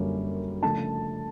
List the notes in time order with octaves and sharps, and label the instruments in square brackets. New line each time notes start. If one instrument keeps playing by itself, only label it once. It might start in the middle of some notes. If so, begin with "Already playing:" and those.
Already playing: [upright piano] F#2 D3 G3 A#3 C#4
C#3 F3 A3 D4 A5